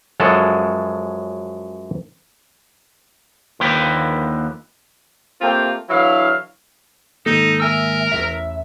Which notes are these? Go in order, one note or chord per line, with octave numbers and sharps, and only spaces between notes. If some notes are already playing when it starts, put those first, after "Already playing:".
F#2 F3 F#3 G#3 A4 F#5
D#2 D3 F3 A#3 B4 G5
A3 A#3 C4 F4 G4 G5
D3 E3 F#3 E4 F5
G#2 D#3 A#3 D#4 A4
A#4 E5 G#5 E6
E1 A1 E2 E5